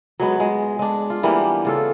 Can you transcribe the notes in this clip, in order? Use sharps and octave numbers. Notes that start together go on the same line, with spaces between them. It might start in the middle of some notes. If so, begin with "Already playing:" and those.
F#3 G#3 B3
G#3
G#3 D4
F4
E3 G3 A#3 B3
C#3 F4 A4